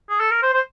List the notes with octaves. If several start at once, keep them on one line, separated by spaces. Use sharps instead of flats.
G#4
A4
A#4
C5
C5